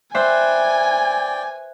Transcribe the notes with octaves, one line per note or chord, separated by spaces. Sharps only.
B4 C5 D5 E5 G5 G#5